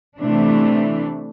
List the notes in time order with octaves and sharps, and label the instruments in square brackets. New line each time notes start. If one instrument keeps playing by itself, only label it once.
[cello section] C3 E3 A3 D4